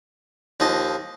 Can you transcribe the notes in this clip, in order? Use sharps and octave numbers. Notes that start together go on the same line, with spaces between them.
D#2 F3 D#5 A5